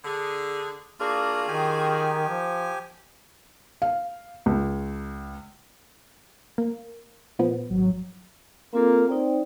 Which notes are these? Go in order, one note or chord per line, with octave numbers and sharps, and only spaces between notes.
D3 G#4
A#3 D4 F4 F#4 G#4 A#4
D#3 G4 G#5
F3
F5
C#2
A#3
A#2 F3 B3
G#1 F#3
A#3 C4 F4 A4
C4 D#4 D5 G5